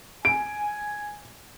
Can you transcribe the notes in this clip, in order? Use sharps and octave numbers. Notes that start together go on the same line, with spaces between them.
G#5 D7